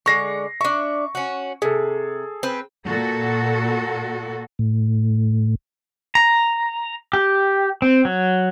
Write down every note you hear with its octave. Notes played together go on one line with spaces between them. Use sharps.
D3 G#3 C#6 A#6 C7
D4 E5 C#6
C#4 F#4
C3 G#4 A4
C4 B4
A#2 F#4 A4
A2
A#5
G4
C4
F#3